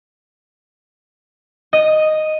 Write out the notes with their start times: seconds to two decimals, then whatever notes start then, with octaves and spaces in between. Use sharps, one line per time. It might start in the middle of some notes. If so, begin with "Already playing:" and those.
1.73 D#5